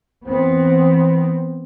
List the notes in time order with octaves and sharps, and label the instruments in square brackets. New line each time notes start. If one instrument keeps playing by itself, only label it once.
[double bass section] E3 B3 C4